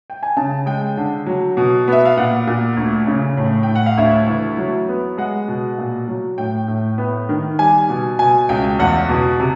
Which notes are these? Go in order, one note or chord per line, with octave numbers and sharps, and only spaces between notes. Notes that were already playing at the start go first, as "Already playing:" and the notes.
G5
G#5
C#3 A5
G#3 G5
D3
F#3
B2
B3 E5
F5
A#2 F#5
A#2
D2
C#3
A2
G5
A2
F#5
F5
D2 E5
E3
F#3
B3
G#3 F#5
B2
A#2
F#3
A2 G5
A2
B3
D#3
G3 G#5
B2
B2 G#5
C#2 G5
E2 F#5
B2
C3